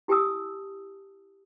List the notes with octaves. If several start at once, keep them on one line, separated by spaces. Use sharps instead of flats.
E4 G4 G#5 A5 D#6 E6